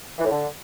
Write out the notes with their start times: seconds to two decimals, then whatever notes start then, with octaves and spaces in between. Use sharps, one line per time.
0.18 E3
0.24 A2
0.31 D3